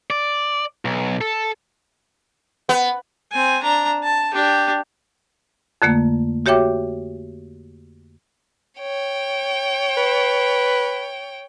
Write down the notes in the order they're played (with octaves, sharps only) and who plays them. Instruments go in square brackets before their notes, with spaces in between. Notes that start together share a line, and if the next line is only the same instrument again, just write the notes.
[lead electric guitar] D5
B1
A4
[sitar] B3
[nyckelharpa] C4 G#5
D4 A#5
A5
D4 G4
[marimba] F2 D3 A3 A#3
F#4 G4 C#5 E5 G5 D6
[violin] C#5 G5
[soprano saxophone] B4